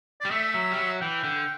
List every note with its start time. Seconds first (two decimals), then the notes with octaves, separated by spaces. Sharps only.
0.21 G3 D5
0.31 A3 E5
0.54 F#3
0.71 G3
0.78 F#3
1.01 E3 G5
1.24 D3